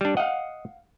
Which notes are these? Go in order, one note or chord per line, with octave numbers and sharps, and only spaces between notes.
G3 D4
D#5 F5 F#5